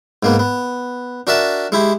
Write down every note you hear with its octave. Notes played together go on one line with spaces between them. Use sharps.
G#2 A#3 B3
B3
D4 F#4 A#4 E5 A5
G#3 E4 G4